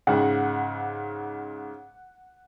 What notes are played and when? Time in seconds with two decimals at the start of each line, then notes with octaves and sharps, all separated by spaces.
0.07 G#2 C#3 F#5